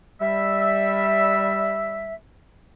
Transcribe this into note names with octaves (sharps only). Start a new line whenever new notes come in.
G3 E5